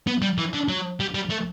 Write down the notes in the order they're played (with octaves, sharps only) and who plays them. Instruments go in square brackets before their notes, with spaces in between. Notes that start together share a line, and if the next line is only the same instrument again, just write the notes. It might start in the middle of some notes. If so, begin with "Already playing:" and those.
[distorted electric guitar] B3
G3
E3
D3
F#3
G3
G3
A3